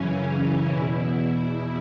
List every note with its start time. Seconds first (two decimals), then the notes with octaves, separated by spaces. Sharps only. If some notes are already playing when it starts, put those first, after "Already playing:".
Already playing: F#2 C#3 E3 C#4
0.69 E2 B2 E4